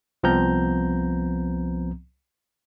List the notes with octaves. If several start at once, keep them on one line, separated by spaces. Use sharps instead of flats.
C2 F3 B3 C4 A#5 G6